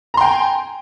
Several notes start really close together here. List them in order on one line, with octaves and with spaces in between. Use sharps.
A#5 C6 G5 G#5